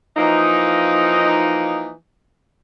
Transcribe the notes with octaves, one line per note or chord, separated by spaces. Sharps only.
E3 F3 A#3 D#4